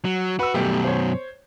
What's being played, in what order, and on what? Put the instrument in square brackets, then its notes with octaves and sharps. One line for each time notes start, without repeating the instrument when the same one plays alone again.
[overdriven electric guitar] F#3
[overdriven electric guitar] F#4 [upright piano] B4 E6
[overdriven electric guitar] F#2 B2 [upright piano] G3 A3 G4
[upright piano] C5 C#5